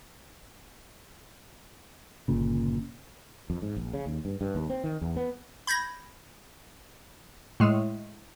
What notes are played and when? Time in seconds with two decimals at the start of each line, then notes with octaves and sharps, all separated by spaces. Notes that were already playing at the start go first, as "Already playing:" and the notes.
2.28 G1 A#2 C#3
3.50 F2
3.62 G#2
3.77 A#1
3.93 C#3
4.06 D#2
4.25 G2
4.41 G2
4.55 D#2
4.70 C4
4.84 D#3
5.01 E2
5.16 B3
5.67 B5 G6 G#6 A#6
7.60 A2 G#3